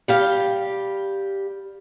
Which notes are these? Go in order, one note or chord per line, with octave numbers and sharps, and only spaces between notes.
G3 G4 F5